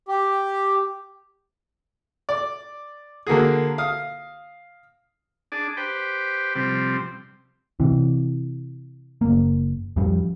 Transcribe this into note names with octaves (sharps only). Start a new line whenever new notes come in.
G4
D5
D3 A#3 F#4 G#4
F5 D#6
D4 G#4 D5
G4 B4 C5 G5
C3 F3 G3 C4
C3 E3
F#1 A#3
F2 F3 G3